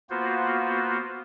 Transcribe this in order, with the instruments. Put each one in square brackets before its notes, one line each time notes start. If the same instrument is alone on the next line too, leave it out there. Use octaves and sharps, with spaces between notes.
[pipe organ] A#3 B3 F4 F#4 C5